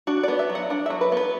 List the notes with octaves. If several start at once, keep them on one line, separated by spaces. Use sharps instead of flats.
D4 F#4
B3 D5
E5
F#3
F#5
D4 F#5
F#3 E5
B4
B3 B4